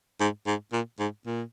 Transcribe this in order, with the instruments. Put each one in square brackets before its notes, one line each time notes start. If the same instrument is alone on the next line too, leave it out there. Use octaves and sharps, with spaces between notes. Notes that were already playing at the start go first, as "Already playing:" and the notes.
[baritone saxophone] G#2
G#2
A#2
G#2
A#2